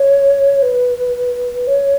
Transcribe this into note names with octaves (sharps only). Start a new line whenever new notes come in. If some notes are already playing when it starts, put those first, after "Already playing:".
Already playing: C#5
B4
C#5